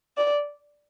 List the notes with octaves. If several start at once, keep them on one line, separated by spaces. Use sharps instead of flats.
D5